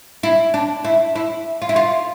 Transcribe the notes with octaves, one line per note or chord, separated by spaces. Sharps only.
E4
D4
E4
E4
F4
E4
F4